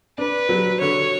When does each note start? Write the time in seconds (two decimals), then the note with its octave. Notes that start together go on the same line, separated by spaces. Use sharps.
0.18 D4 B4
0.49 F#3
0.81 D3 C#5